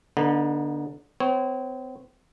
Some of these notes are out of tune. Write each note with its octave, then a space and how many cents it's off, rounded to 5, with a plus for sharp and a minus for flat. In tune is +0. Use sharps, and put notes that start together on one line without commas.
D3 +0 B3 -35 D#4 +0
C4 -40 C#5 -25